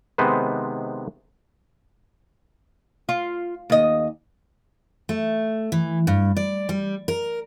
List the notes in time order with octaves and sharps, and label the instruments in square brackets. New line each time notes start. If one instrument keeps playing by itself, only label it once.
[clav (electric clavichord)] C3 D#3 G#3 B3 B4 C5
[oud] F4
D#2 D#5
[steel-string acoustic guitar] A3
E3
G2
D5
G3
A#4